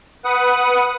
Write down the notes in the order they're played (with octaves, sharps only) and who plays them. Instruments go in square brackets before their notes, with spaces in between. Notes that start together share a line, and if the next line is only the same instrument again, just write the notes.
[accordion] B4 F#5 D#6